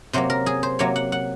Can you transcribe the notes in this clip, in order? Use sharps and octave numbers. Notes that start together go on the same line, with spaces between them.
C3 F#3 A#3 C5
A#4
G#4
C5
C3 F#3 A#3 C#5
F#5
F#5